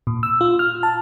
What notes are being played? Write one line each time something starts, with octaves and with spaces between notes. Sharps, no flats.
A#2
E6
F4
F6
A5